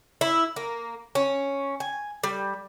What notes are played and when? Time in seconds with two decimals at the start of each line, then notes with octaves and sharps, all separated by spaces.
0.21 E4
0.56 A#3
1.15 C#4
1.80 G#5
2.24 G3